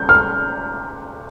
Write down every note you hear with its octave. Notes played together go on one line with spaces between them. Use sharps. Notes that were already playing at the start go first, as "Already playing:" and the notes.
Already playing: G6
F6